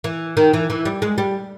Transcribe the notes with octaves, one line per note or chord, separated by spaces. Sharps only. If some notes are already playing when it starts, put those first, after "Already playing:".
E3
D#3
E3
E3
G3
G#3
G3